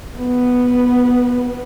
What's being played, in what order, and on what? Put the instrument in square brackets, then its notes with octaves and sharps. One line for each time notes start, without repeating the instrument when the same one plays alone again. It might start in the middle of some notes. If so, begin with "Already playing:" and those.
[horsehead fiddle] B3